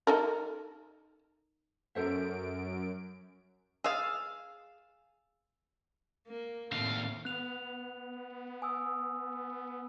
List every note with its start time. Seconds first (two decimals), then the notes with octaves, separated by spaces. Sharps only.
0.07 D#4 A4 A#4
1.95 F#2 A4 C5 E5 D7
3.84 G#4 F5 E6 A6 C7
6.27 A#3
6.72 D#2 A2 A3 C4 F5
7.25 B3 F#6 F7
8.62 G#5 D#6 E6